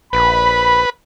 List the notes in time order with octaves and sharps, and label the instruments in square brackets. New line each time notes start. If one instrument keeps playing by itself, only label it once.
[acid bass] A#1 [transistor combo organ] B4 [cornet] B5